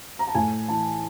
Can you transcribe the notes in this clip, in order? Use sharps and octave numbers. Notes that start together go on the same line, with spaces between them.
A#5
A5
A2 G#5
E3 A5